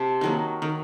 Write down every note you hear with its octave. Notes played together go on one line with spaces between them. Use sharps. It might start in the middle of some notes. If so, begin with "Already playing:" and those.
Already playing: C3 A5
D#3 F#3 A#3
D#3